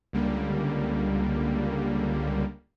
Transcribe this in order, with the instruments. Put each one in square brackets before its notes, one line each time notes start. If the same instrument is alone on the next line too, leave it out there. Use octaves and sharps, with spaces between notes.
[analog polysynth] C#2 D3 G3 A#3